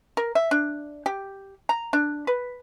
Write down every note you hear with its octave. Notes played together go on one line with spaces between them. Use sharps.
A#4
E5
D4
G4
A#5
D4
B4